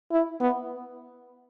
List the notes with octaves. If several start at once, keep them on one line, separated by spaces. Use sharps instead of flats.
E4
B3